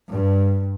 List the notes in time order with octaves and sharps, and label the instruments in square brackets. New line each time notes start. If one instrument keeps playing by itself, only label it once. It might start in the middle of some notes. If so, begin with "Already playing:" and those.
[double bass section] G2